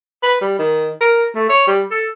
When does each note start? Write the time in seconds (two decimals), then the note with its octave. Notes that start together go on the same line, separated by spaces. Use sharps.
0.23 B4
0.41 G3
0.59 D#3
1.01 A#4
1.35 A3
1.49 C#5
1.67 G3
1.91 A4